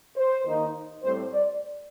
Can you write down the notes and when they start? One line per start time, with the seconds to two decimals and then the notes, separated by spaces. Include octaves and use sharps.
0.16 C5
0.45 D#2 D#3 A#3 D#4
1.03 A2 G3 C4 C5
1.33 D5